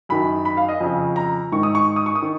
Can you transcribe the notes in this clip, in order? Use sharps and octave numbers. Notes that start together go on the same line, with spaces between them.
F#2 D#3 B5
B5
F5
D#5
F2 C#3
A#5
G#2 D#3 C#6
D#6
C#6
D#6
C#6
D#6
D#3